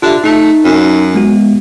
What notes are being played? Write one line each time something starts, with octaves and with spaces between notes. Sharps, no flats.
D3 F4 G4 E5
A3 D#4
F#2
G#3 B3 F#4